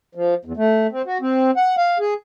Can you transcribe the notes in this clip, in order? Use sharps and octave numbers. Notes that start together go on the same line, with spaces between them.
F3
E2
A3
C4
F#4
C4
F#5
F5
G#4